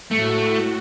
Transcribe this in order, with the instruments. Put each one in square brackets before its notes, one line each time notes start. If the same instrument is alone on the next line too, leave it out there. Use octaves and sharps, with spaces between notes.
[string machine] A2 F#4 [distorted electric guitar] A3